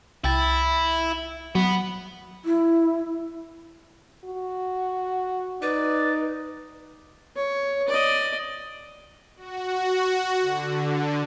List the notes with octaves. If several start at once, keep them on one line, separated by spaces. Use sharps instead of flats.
C2 E4 G5 A6
F#3 B3
E4
F#4
D#4 B4 D5
C#5
D5 D#5
F#4
D3